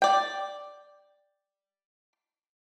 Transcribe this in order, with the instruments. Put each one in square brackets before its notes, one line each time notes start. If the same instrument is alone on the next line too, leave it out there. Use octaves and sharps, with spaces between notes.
[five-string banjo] D5 G5